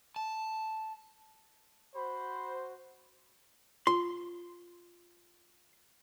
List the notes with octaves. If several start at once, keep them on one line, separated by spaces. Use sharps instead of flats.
A5
F#4 C5 B5
F4 C6